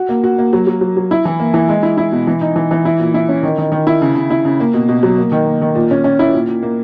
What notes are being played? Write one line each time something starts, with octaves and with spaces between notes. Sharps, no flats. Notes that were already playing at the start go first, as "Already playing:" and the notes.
Already playing: F#4
A#3
F#4
A#3
F#3
F#3
F#3
F#3
E4
E3
A#3
E3
G#3
E4
E4
B2
E3
D#4
E3
E3
E4
A#2
E4
C#4
D#3
D#3
D#3
E4
C#3
C#3
E4
C#3
A#3
B2
B2
F#3
A#3
D#3
A#3
D#3
A#2
C#4
C#4
E4
A#2
A#2
A#3